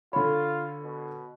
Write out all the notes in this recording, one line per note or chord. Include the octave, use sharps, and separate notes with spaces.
D3 F4 C#5 B5
B2